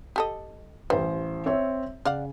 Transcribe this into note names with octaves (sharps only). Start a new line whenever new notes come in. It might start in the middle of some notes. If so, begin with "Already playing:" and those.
G4 A4 D#5
A1 G3 C5
C4 C#5 E5
C#3 D5 F5 F#5